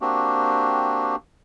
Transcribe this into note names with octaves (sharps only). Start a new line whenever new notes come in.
A#3 C4 D4 F#4 G4